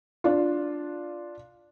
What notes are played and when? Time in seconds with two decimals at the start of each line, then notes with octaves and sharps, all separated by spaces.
0.24 D4 F4